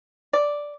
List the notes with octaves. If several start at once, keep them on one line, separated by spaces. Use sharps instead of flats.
D5